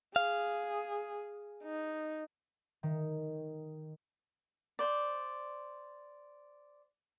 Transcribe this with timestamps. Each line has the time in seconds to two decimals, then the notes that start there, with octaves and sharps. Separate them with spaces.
0.16 G#4 F5
1.63 D#4
2.83 D#3
4.79 C5 D5